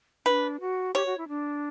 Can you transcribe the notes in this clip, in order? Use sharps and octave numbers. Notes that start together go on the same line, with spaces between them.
D4 B4
F#4
G4 C#5
F#4
E4
D4